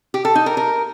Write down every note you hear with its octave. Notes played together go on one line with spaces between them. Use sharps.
G4
A4
D#4
A#4
A#4